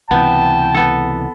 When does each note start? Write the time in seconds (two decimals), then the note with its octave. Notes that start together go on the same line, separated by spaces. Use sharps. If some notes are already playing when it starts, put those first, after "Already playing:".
0.11 C#2 C3 E3 B3 G5 A5
0.74 B3 A4